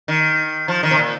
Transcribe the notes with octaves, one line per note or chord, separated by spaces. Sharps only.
D#3
F3
D#3
C3
A#2